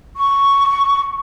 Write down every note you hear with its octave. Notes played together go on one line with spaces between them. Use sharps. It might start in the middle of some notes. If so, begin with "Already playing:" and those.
C#6